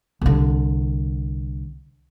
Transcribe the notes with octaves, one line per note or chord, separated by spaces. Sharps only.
C2 D3